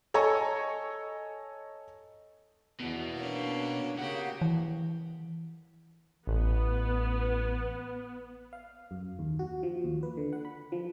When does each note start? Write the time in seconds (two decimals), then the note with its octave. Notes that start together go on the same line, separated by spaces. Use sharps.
0.14 A4 C#5 D#5 G#5 A#5 C#6
2.80 E2 B2 B3
3.16 A#3 C#4 D4
3.99 C#3 A#3 F#4 G4
4.41 E3
6.27 A1 B3
8.53 F5
8.91 F#2
9.19 D#2
9.39 F#4
9.63 F3
9.84 D#2
10.03 B4
10.17 D3
10.33 F#5
10.45 B5
10.72 F3